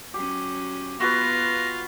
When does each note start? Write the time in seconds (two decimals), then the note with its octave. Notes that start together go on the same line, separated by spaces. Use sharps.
0.14 F#3 C#4 G4
1.00 B3 F4 F#4 B4 A#6